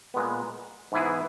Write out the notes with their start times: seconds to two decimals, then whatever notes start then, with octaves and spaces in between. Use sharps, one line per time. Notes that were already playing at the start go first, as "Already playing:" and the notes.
0.14 A#2 G#3 B3
0.92 G#2 E3 B3 E4 G#4